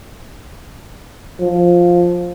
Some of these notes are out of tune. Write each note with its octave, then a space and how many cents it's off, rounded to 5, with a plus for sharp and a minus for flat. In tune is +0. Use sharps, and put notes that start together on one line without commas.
F3 +5